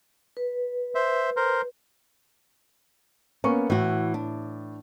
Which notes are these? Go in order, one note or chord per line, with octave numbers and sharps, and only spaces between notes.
B4
C5 E5
A#4 C5
A#3 B3 C#4 C#6
A2 E3 F#4
D4